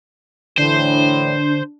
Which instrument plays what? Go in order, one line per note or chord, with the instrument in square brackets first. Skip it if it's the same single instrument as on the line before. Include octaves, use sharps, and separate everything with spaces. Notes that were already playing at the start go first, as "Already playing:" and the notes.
[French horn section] A2 E3 [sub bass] D3 [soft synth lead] D4 [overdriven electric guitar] C5